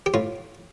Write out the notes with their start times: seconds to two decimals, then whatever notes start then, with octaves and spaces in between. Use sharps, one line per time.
0.06 G4
0.14 A2 F4